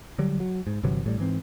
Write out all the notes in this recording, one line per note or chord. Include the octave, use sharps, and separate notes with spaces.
D3 F#3 G3
F#3
G#2
G1 C3 E3 F#3
A1 A2 G3
G#2 E3 C4